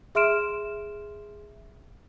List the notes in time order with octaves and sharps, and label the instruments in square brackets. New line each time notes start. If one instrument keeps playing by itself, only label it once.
[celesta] G#4 E5 C6 F6 D7 E7